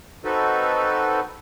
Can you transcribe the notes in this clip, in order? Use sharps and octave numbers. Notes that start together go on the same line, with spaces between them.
C4 D#4 F#4 A4 B4